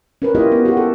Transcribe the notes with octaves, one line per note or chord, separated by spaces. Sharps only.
C#4 A#4 B4
A#3 E4 F4 G4 D#5
B3
F#4 G4
A4